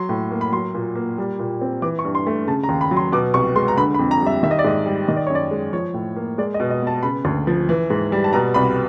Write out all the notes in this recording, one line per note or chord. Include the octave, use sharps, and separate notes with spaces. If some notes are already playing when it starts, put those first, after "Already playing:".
Already playing: F#3 C6
A2
A#3
B5
F#3 C6
A#2
A#3
G3
A#2
C4
E3 D6
C#6
G2
C6
A3
C#3 A5
A#5
D#2
B5
F#3
C6
B2 D6
C2 C#6
G#3 C6
A#5
D3 B5
B5
F2
A#5
G3 E5
D#3 E5
D#5
D5
G#2 D#5
G3
D#3 D#5
D5
F#2 C#5
D5
G#3
F3 C#5
A2
A#3
G#3 D5
D#5
B2
D#5
B3 A5
C#3 B5
D2
F3
E3
G#2
G3
A5
B2 A#5
C2 B5